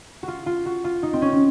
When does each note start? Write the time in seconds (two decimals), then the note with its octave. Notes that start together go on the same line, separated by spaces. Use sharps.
0.23 F#4
0.28 F4
0.46 F4
0.66 F#4
0.84 F4
1.03 D#4
1.13 C4
1.22 C#4
1.32 C4